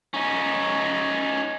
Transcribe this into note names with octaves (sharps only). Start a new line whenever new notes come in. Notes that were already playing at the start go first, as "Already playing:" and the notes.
C#4 D#4